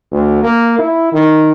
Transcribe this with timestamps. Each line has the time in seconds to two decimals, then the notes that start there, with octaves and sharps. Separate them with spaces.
0.12 D2
0.43 A#3
0.79 E4
1.13 D#3